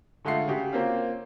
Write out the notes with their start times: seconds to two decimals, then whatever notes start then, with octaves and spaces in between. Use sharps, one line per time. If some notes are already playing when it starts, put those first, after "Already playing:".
0.25 D3 G#3 A3 F4 F#5 C7
0.48 C#3 F#4 G4
0.73 A#3 C4 C#4 F4